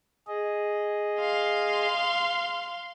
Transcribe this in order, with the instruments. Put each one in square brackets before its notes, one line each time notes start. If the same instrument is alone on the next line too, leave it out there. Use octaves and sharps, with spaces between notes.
[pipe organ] G#4 D#5
[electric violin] F5 C6